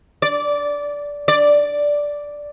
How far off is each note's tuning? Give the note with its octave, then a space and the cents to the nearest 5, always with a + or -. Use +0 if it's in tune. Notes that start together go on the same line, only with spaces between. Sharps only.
D5 -15
D5 -5